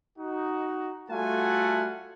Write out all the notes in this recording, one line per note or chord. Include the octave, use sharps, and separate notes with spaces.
D#4 F#4
G3 A3 F4 F#4 F#5 G#5